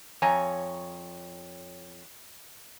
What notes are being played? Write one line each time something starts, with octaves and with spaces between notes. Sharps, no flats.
F2 C#5 G#5 A#5